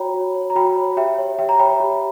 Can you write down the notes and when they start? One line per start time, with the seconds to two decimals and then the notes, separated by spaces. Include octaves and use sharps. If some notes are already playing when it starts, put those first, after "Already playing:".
Already playing: F#4 C#5 G5 A#5 B5
0.14 F#4
0.34 C#5
0.50 A#5
0.55 F#4 G5 B5
0.76 C#5
0.97 G4 E5 G5
1.18 C#5
1.39 G4 E5 G5
1.49 A#5
1.59 C#5 G5 B5
1.80 G4